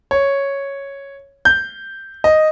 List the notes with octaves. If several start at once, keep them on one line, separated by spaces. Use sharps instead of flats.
C#5
G6
D#5